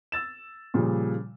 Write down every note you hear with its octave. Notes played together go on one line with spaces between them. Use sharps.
E6 A6 E7
A#2 C#3 F3 G3